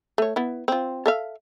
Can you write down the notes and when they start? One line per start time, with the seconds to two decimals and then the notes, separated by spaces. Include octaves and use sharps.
0.18 A3 C#5
0.36 B3 E4
0.68 C4 F4
1.06 A4 E5 F5